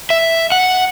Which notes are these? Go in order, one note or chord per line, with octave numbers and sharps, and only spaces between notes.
E5
F#5